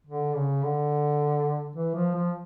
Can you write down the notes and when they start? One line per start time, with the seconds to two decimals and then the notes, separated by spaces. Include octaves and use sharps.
0.07 D3
0.35 C#3
0.63 D3
1.76 E3
1.95 F3
2.15 F3